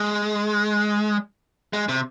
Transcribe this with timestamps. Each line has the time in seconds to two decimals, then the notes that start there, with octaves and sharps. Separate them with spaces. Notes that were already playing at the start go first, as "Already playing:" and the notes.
Already playing: G#3
1.73 G#3
1.89 C3